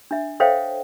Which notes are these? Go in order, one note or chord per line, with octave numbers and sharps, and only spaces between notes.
D4 E5
A4 C5 C#5 E5 F5 G5